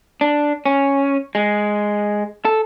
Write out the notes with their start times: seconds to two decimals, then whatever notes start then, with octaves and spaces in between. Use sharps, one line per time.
0.21 D4
0.66 C#4
1.35 G#3
2.45 A4